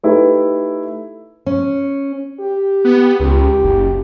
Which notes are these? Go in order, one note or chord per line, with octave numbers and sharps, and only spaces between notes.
A3 D#4 E4 G4 B4
C#4
G4
B3
C#2 G4
F#1